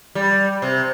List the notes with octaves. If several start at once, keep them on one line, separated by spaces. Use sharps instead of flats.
G3
C3